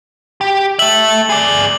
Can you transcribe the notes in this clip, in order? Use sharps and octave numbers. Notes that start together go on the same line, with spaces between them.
G4
A4 E5 F#7
G#4 D5